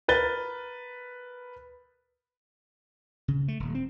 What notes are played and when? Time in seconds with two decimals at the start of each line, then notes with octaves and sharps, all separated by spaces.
0.08 A#4 B4 A6 G7
3.28 C#3
3.48 A3
3.60 D#1
3.75 C4